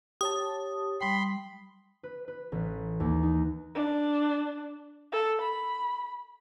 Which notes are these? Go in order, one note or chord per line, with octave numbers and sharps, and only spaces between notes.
G4 C#5 A5 D#6
G3 G5 B5 C6
B4
B4
A1
D#2
D#4
D4
A4
B5